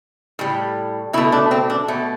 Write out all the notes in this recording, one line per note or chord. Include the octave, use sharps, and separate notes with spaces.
A2 G3
B2 A3 E4
D4
C4
D4
B2 A3